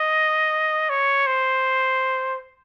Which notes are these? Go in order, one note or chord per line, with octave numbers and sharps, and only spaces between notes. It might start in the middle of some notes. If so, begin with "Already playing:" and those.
Already playing: D#5
C#5
C5